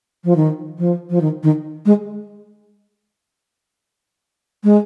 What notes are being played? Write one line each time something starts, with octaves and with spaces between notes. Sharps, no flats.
F3
D#3
F3
F3
D#3
D#3
G#3
G#3